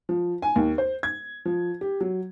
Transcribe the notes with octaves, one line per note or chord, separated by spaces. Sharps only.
F3
G#5
D#2
C5
G#6
F3
G4
F#3